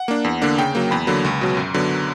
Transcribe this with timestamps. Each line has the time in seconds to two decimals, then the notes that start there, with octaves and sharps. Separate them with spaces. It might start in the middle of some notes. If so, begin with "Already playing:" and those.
Already playing: F#5
0.08 A#3 D4
0.24 E2
0.42 D3 A#3 D4
0.58 C#3 G5
0.75 F#3 A#3
0.91 E2 B5
1.07 D3 F#3 A#3
1.25 C#2
1.41 B2 F#3
1.57 F#2
1.74 D3 F#3 B3